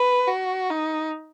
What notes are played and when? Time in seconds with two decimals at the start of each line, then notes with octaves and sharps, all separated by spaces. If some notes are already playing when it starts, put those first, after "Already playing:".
Already playing: B4
0.27 F#4
0.70 D#4